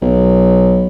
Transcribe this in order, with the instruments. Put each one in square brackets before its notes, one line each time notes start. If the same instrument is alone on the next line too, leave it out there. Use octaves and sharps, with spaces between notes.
[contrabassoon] B1